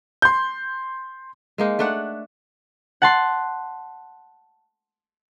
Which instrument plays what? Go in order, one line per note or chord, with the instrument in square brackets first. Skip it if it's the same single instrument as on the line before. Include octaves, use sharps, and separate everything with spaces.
[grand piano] C6 G6
[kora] G#3 A#3 D#4
A3 D4 F#5
[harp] F#5 A5 C6